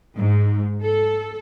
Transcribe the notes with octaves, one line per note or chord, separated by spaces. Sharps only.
G#2
A4